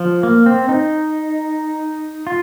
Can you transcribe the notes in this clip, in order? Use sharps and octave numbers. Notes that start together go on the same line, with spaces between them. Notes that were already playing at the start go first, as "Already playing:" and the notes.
Already playing: F3
A#3
C4
D#4
F4